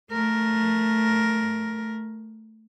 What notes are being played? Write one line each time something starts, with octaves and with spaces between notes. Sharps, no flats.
A3 A#4